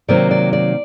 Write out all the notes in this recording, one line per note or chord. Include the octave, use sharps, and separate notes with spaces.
C3 D#3 F#3 A#3 D5
D5
D5